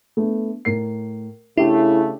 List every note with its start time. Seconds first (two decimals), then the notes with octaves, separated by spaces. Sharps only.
0.17 A3 B3 D4
0.65 A2 A#4 C7
1.57 C#3 A3 D4 E4 G4 E5